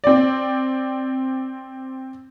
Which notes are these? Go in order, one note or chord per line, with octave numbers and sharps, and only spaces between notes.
C4 D5